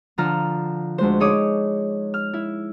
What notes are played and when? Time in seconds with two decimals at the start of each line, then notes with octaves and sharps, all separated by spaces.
0.18 D3 F3 F4 A#5 F6
0.98 D2 G#3 C5
1.20 D#4 G#4 C#5 D6 D#6
2.14 F6
2.33 E4